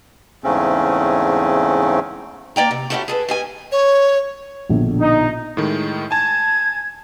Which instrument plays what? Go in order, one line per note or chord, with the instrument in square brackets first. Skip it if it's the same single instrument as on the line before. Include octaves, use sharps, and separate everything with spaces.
[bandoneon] E2 G#2 C#3 A3 C4 C#4
[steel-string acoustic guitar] A#3 D5 G5 A#5
C3
A3 C#4 D#4 E4 F#4 G4
G#4 A4 B4
G3 D#5 G#5
[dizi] C#5
[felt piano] A#1 B2 D3
[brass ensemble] D#4
[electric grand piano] A2 D#3 G#3
[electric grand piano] G#5 A5 [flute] G#6